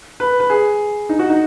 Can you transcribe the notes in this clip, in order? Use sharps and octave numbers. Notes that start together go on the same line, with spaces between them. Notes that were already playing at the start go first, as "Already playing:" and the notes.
B4
B4
G#4
D#4
F#4
D#4